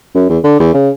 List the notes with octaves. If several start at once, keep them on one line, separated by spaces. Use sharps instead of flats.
F#2
E2
D3
E2
C#3